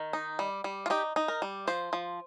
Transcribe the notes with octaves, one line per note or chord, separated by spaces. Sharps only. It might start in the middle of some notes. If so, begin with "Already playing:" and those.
Already playing: D#3
D#4
G3
G3
F4
D#4 G4
D#4
A#4
G3
F3 C5
F3